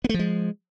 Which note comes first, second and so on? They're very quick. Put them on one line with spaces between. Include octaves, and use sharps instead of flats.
B3 A3 F3 G#3